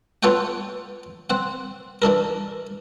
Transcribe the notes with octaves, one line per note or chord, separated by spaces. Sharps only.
B3 F4 A4 C#5 F#5 G5
C4 F#5
E3 D4 A4 A#4